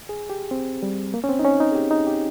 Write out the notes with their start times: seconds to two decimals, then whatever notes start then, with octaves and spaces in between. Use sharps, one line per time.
0.09 G#4
0.30 G4
0.51 C4
0.83 G3
1.14 A#3
1.24 C#4
1.29 C4
1.39 D#4
1.45 C#4
1.60 D#4
1.72 G#4
1.75 G4
1.91 D#4
2.07 G4